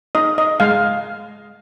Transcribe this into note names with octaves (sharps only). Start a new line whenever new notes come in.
D#4 D#5
D#5
G#3 F5